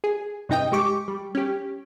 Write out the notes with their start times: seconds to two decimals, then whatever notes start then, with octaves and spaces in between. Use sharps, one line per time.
0.04 G#4
0.49 G2 C3 D#4 D#5 G5
0.72 G#3 G4 C#6 D6
1.08 G3
1.35 C#4 G4